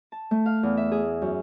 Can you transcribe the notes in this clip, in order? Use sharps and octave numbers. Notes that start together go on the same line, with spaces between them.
A5
A3
F5
E2
E5
G#4
F#2